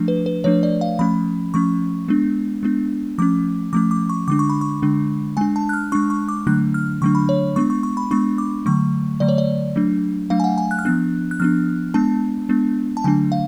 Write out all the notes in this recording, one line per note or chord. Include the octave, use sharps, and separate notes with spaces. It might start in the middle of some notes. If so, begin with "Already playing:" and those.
Already playing: F3 A3 D4
B4
B4
F3 A3 D4 C#5
D5
F5
F3 A3 C#4 B5
F3 A3 C#4 C#6
G#3 B3 D4
G#3 B3 D4
F3 A3 C#4 D6
F3 A3 C#4 D6
D6
C#6
D3 G#3 D4 D6
C#6
B5
C#6
D3 G#3 D4
G#3 D4 G#5
A5
F#6
F6
G#3 D4 C#6
C#6
D6
D3 F#3 A3 D4 F#6
F6
D3 F#3 A3 D4 C#6
B5
C#5
G#3 B3 D4 C#6
C#6
C#6
B5
G#3 B3 D4 C#6
D6
D3 F#3 A3 C#6
D3 F#3 A3 D5
C#5
D5
F#3 A3 D4
F#3 A3 D4 F5
G#5
F#5
G#5
F#6
F6
F3 B3 D4 F#6
F#6
F3 B3 D4 F6
G#3 B3 D4 A5
G#3 B3 D4
A5
D3 F#3 A3 D4 G#5
F5